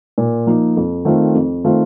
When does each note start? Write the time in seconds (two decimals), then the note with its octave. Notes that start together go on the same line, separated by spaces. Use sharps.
0.18 A#2
0.47 F3 A#3 D#4
0.77 F2
1.05 D#3 A3 C4 F4
1.35 F2
1.64 D#3 A3 C4 F4